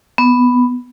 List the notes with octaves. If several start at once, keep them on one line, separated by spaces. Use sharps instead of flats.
B3